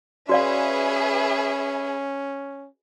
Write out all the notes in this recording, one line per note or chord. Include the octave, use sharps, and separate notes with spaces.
C#4 F#4 G#4 B4 D5 E5 F5